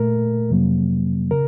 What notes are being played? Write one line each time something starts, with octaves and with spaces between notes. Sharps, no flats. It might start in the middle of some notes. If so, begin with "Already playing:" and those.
Already playing: A#2 A3 A#4
F2 C3 F#3 A#3
C#3 A#4